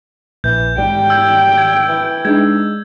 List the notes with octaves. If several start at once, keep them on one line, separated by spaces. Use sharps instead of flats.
A#1 E3 G6
G#2 G3 G5
E6 G6 G#6
G#6
E3
G#3 D4 D#4 G#6